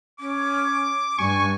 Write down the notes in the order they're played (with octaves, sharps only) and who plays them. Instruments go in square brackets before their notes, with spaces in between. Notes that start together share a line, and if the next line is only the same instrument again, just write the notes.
[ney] C#4 [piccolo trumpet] D6
[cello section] G2 [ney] D4 [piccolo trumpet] G#5 [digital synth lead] C#6